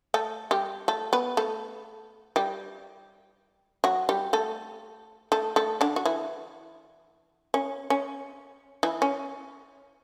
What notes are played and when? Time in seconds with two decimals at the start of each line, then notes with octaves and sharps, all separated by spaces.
0.14 A3 A4
0.51 G3 G4
0.88 A3 A4
1.13 B3 B4
1.37 A3 A4
2.36 G3 G4
3.84 F#3 F#4
4.09 G3 G4
4.33 A3 A4
5.32 A3 A4
5.56 A3 A4
5.81 D3 D4
5.96 F#4
6.05 E3 E4
7.54 C#4
7.90 C#4
8.83 E3 E4
9.02 C#4